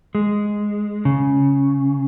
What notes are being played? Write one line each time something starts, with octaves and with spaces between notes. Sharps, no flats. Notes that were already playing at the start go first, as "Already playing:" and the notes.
G#3
C#3